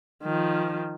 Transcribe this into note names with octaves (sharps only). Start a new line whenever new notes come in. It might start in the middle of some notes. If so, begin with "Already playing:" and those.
D#3 F3